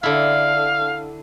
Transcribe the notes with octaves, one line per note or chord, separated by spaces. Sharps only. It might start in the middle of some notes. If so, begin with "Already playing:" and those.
D3 E4 F5